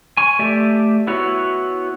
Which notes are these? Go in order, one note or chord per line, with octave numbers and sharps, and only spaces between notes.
G#5 C#6
A3 G4 D5 E5
B3 E4 F#4 C#5